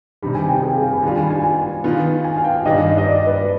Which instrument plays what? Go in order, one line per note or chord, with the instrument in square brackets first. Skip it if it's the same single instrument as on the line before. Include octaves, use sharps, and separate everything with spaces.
[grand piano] C3 D#3 G3 [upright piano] B5
[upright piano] G#5
G5
G#4
F5
G#5
B5
[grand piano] D#3 G3 D4 F4 [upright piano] G#5
[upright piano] G#5
B5
G#5
G#5
[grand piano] D#3 B3 F4
[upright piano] G#5
F5
G5
[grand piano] G2 D#3 G3 D4 [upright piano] D#5
[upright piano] D#5
D5
B4